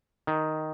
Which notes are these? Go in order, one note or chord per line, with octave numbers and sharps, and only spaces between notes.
D#3